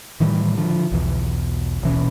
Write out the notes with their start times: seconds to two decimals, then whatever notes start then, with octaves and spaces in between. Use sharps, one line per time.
0.20 A2 D#3 E3 G3
0.57 D3 F3
0.92 B1 E2
1.82 D#1 B2 E3 C#4